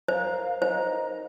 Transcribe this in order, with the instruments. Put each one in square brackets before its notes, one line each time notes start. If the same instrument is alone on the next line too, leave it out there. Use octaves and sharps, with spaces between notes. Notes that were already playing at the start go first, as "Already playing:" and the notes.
[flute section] A#4 F5 A#5 [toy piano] C5
[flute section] D#4 A#4 D#5 A#5 [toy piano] C5